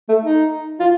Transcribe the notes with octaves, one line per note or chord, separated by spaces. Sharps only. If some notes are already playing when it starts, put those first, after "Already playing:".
A3
D#4
F4